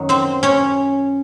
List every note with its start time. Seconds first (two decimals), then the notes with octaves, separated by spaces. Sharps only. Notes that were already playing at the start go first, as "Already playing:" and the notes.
Already playing: F#2 D#3 F#3
0.09 C4 C5
0.43 C#4 C#5